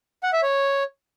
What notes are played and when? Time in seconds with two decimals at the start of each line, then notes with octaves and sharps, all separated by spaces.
0.23 F#5
0.33 E5
0.43 C#5